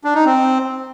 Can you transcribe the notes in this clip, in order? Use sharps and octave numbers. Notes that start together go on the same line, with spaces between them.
D4
D#4
C4